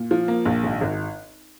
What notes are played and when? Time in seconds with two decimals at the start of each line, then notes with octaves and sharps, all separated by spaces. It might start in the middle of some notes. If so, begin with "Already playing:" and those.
Already playing: A#2
0.11 F3
0.28 A#3
0.45 A#1
0.64 G#1
0.81 G#1